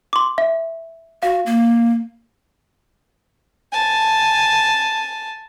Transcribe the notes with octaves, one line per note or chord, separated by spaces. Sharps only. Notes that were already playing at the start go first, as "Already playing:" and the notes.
C6 D6
E5
F#4 F5
A#3
G#5 A5